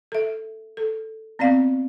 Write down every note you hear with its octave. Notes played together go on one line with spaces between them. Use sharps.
A4 E5
A4
B3 C4 D5 F5